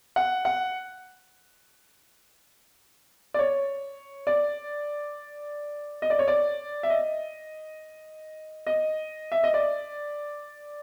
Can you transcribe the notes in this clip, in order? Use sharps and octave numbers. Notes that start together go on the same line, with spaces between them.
F#5
F#5
D5
C#5
D5
D#5
D5
C#5
D5
E5
D#5
D#5
E5
D#5
D5